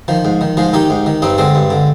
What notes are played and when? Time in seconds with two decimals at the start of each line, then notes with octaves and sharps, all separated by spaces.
0.08 D#3 F3
0.25 G#2
0.41 D#3
0.57 G#2 F3 G#3
0.73 D#3 D#4 G4
0.90 G#2
1.06 D#3
1.22 G2 C4 D#4
1.38 D3 G#3 C4
1.55 G2
1.70 D3